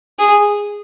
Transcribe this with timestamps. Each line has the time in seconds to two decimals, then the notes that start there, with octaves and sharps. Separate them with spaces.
0.19 G#4